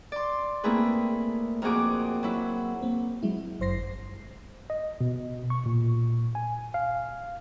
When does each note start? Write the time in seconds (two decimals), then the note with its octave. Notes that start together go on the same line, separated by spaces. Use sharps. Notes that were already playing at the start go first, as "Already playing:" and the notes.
0.12 D5 C6
0.64 A3 A#3 C4 E4 G#4 B4
1.62 F2 A#3 C4 F#4 G#4 D6
2.23 F#3 E4
2.81 A#3 C4 C5
3.23 F#3 G#3 E4
3.60 G1 F#2 C5 C6 A#6 C7
4.70 D#5
5.01 B2
5.50 C#6
5.66 A#2
6.35 G#5
6.74 F5